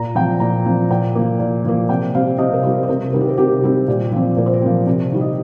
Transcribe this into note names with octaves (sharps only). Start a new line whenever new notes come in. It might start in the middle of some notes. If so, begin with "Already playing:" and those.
Already playing: A#2 A#5
F3 C4 G5
A#2 A#5
F3 C4
A#2 G5
F3 A#3
A#2
F3 A#3
C3 G5
G3 C4 F5
C3 D#5
A#4
G3 C4 C5
C5
C3 A#4
D#3 G3 C4 A#4
G4
A#4
C3 G4
D#3 G3 C4
A#2
F3 C4
A#2 A#4
C5
A#4
F3 C4
C3
D#3 G3
D#5